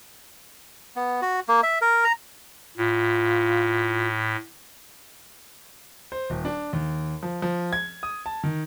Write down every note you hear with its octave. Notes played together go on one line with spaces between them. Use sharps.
B3
F#4
A#3
E5
A#4
A#5
A2 F4
C5
D#1
D4
D#2
F3
F3
G#6
D#6
A5
D#3